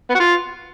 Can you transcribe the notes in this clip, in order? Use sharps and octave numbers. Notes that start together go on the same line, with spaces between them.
B3
F#4
F4